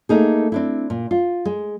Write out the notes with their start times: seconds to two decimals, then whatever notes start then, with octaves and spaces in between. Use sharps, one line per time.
0.09 A3 A#3 D#4 G#4
0.52 C4 D4 E4
0.90 A#2
1.11 F4
1.45 G#3